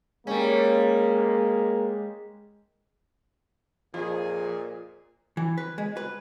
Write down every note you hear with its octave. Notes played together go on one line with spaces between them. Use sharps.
G3 G#3 A#3 C#4
F2 A#2 F4 G#4
E3
B4
G#3
B4